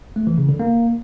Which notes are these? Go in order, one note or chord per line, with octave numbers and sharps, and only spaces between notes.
A3
E3
C#3
D3
A#3